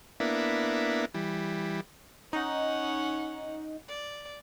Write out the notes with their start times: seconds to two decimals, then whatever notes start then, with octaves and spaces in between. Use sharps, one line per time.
0.20 A#3 B3 D4 E4
1.14 E3 G3
2.33 C#4 D#4 F#5
3.89 D5